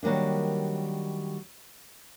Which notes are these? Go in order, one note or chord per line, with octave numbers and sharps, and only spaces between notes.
D#3 F#3 G3 A#3 D4